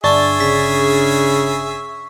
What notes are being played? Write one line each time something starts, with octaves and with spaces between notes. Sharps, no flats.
G1 D4 G#4 E5 C#6 A6
C#3 B6